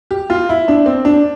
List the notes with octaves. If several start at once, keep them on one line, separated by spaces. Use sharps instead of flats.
G4
F4
E4
D4
C4
D4